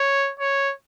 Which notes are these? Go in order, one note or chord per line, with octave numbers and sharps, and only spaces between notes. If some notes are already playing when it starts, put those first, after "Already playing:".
Already playing: C#5
C#5